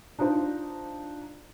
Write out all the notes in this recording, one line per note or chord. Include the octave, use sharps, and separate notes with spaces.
D4 D#4 F4 C5